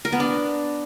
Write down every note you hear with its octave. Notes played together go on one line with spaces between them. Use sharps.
A#4
B3
D4